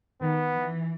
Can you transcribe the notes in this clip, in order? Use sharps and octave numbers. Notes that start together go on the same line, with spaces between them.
D#3 B3
E3